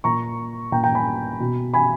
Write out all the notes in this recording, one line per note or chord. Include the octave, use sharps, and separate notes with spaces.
A#2 A#5 C#6
A#2 G5 A#5
G5 A#5
G#5 B5
B2
G#5 B5